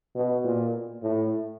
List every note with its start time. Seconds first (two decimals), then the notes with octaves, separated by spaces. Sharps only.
0.15 B2
0.44 A#2
1.03 A2